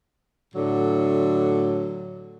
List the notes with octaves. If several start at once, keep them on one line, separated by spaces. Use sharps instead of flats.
A2 D3 F#3